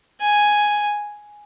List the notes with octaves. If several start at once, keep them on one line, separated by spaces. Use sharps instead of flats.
G#5